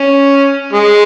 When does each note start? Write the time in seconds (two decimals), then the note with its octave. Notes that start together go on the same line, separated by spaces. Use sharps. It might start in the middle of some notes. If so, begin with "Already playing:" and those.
Already playing: C#4
0.73 G#3